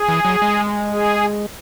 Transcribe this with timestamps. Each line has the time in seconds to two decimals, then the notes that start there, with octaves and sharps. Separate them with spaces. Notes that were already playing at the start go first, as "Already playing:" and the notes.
Already playing: G#4
0.08 E3
0.25 F#3
0.42 G#3
0.91 G#4